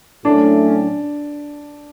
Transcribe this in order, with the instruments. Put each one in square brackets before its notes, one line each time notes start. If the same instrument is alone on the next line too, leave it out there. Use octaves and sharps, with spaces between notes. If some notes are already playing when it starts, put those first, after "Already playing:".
[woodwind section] A2 F#3 A3 C#4 [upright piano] D4